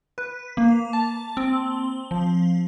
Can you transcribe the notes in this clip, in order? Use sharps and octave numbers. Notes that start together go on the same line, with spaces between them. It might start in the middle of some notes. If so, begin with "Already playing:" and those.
B4
A#3
A5
C4
F3